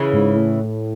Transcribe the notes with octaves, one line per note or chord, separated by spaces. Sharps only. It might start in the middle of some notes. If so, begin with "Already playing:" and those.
Already playing: C#3 E3
G#2
A2